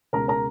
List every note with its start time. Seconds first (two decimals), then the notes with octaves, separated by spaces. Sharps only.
0.13 C#2 B2 G#3 A#4 A#5
0.28 A#4 A#5